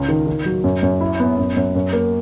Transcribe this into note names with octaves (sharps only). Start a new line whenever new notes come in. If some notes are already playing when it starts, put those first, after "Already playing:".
Already playing: C#2 C#4
D#3
D#3
F#3
F#2
F#2
E4
B3
F#2
F#2
F#2
A#3